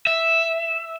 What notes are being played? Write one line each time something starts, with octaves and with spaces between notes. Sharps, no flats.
E5